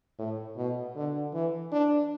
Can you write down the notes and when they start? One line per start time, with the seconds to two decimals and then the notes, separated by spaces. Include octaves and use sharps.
0.19 A2
0.57 B2
0.96 D3
1.34 E3
1.72 D4